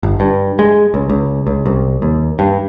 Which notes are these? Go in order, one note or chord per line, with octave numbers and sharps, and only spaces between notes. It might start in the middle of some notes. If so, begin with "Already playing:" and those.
G1
G2
G#3
C#2
C#2
C#2
C2
D#2
G2